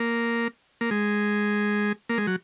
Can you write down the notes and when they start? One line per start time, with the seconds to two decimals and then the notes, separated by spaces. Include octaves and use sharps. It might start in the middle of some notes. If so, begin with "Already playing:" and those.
Already playing: A#3
0.81 A#3
0.91 G#3
2.09 A#3
2.18 G#3
2.27 F#3